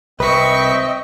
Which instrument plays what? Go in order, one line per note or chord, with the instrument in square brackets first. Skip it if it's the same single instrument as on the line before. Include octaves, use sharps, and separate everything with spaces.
[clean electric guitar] C2 B4 [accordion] C4 D#5 [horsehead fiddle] E5 G5 [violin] C#6 B6